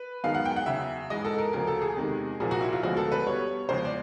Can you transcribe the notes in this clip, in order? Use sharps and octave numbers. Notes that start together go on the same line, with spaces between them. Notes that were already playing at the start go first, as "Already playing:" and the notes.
Already playing: B4
F#2 D#3 G#3 B3 F5
F#5
G5
F#5
E2 C#3 F#3 E5
G#2 E3 G#3 D#5
A4
A#4
D2 C#3 F3 A#3 A#4
A4
G#4
E2 C3 D#3 G#3
C2 A#2 F3 A#3 G#4
F#4
E4
F4
D2 D3 F3 G#3 B3 F#4
A4
B4
B2 G3 B3 C#5
E2 C#3 F3 G#3 C5
D5